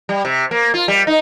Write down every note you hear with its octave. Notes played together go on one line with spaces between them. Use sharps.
G3
C3
A#3
F4
G3
D#4